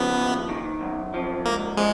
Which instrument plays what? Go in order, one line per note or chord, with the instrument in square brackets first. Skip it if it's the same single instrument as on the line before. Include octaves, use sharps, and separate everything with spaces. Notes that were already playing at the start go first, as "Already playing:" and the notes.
Already playing: [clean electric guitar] C#3 F3 [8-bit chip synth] B3
[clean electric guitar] D#2
D#3
F#2
F3
[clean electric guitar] G#2 [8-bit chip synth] A#3
[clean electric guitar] F3 [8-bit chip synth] G#3